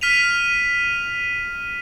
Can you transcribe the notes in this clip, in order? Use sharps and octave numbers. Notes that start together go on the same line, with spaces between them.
F6 B6 D#7 F7